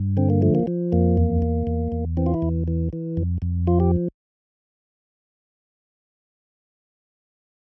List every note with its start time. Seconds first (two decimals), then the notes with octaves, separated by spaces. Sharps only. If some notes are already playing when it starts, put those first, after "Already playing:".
Already playing: G2
0.17 D3 C4
0.30 A#3
0.42 F3 A3
0.55 A#3
0.67 F3
0.92 F2 A#3
1.17 E2
1.42 E2
1.67 E2
1.92 E2
2.17 E3 C4
2.26 F4
2.34 E4
2.42 E2
2.68 E3
2.93 E3
3.17 F2
3.42 F2
3.67 F3 F4
3.80 G4